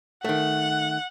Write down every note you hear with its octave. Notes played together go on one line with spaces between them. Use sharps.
D#3 A3 F#5